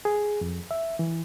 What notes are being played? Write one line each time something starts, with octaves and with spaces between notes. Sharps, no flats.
G#4
F2
E5
E3